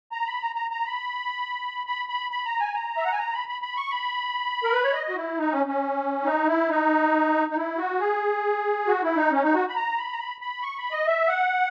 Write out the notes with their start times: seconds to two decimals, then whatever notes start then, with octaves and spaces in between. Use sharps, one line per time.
0.12 A#5
0.26 B5
0.42 A#5
0.55 A#5
0.71 A#5
0.86 B5
1.87 B5
2.09 B5
2.31 B5
2.46 A#5
2.60 G#5
2.74 A#5
2.97 E5
3.05 F#5
3.12 G#5
3.18 A#5
3.33 B5
3.48 B5
3.62 B5
3.77 C#6
3.91 B5
4.64 A#4
4.73 B4
4.84 C#5
4.93 D#5
5.09 F#4
5.16 E4
5.38 D#4
5.52 C#4
5.67 C#4
6.25 D#4
6.47 E4
6.69 D#4
7.50 D#4
7.57 E4
7.78 F#4
8.00 G#4
8.87 F#4
9.03 E4
9.17 D#4
9.31 C#4
9.43 D#4
9.54 F#4
9.69 B5
9.76 A#5
9.98 B5
10.12 A#5
10.19 B5
10.41 B5
10.62 C#6
10.78 B5
10.92 D#5
11.07 E5
11.29 F#5